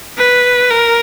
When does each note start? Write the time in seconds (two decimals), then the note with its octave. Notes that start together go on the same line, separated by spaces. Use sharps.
0.18 B4
0.71 A#4